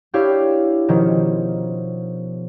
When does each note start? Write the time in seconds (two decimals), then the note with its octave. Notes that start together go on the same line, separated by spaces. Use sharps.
0.14 D4 E4 G4 C#5 F5
0.88 B2 D#3 F3 C#4